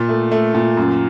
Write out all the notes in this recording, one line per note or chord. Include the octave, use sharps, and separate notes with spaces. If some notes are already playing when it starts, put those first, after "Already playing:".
Already playing: A#2
A3
A3
A#2
F#2